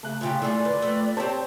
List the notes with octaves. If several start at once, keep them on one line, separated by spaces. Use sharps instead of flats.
C#3 A3 F#6
A2 C#3 F4 G4
A2 A3 G#4 D5
D3 B4
F2 A3
C4 G4 C5 C#5 A5